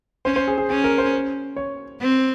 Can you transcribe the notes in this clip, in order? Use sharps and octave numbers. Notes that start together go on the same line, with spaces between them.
C#4 C5
C5
G#4
G#4
C#4 G#4
A#4
C5
C#5
C4